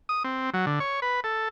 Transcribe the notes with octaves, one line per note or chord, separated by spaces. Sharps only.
D#6
C4
F#3
D3
C#5
B4
A4